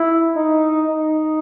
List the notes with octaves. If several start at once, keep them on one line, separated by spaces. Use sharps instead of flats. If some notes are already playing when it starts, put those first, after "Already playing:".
Already playing: E4
D#4
D#4